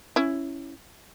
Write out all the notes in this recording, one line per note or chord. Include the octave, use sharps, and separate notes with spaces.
C#4 E4